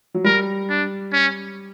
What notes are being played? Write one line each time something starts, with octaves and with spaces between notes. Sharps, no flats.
F#3
G3 A#4
D4
C#4